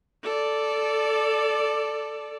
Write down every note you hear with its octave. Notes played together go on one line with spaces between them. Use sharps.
A4 D5